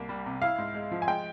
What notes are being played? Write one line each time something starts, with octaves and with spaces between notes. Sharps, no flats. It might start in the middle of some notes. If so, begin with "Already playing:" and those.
Already playing: C2 A#3
G3
C3
E4 F5
G#2
G#3
F3
G#5
G#3 G5